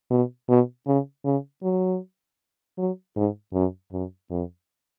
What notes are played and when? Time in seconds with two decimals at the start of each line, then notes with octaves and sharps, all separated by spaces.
0.10 B2
0.48 B2
0.87 C#3
1.25 C#3
1.63 F#3
2.78 F#3
3.16 G#2
3.54 F#2
3.92 F#2
4.31 F2